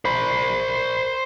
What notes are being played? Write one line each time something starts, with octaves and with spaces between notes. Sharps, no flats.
C5 B5